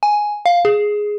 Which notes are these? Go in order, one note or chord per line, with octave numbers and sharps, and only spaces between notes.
G#5
F5
G#4